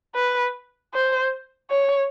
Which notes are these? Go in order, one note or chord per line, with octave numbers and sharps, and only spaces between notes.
B4
C5
C#5